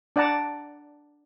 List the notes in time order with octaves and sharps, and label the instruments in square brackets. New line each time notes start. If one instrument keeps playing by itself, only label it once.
[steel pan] D4 D5 F#5 A5 A#5